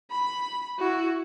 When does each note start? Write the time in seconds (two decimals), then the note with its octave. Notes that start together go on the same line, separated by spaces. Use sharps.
0.11 B5
0.79 E4 F#4